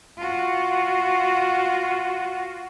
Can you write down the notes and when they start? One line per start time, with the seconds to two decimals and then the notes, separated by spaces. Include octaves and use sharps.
0.17 F4 F#4